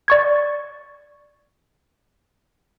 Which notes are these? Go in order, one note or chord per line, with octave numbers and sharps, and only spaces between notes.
D5 C#6 G#6